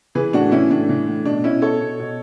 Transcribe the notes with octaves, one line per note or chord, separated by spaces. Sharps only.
E3 G#4 B4
A2 D4 F#4
E3 C#4 E4
A2 D4
E3
A2
B2 D4
B2 C#4 E4
B2 A4 C#5
B2
B2